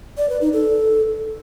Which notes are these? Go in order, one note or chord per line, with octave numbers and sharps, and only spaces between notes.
D5
B4
D#4
A4